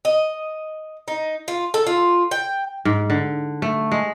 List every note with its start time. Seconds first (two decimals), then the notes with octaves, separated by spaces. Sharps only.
0.05 D#5
1.08 D#4
1.48 F4
1.74 A4
1.86 F4
2.31 G5
2.85 G#2
3.10 D3
3.62 A3
3.91 G#3